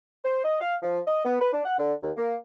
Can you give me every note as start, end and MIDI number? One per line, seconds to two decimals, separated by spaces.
0.25 0.44 72
0.44 0.59 75
0.60 0.76 77
0.83 1.00 53
1.07 1.24 75
1.25 1.37 59
1.41 1.51 71
1.53 1.61 62
1.65 1.77 78
1.79 1.94 50
2.02 2.11 39
2.17 2.36 58